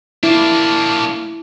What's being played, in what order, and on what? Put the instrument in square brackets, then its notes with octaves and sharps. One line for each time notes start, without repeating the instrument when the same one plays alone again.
[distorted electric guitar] A#3 D4 [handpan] E4